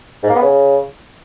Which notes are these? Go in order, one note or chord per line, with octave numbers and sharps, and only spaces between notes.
G#2
A#3
B3
C#3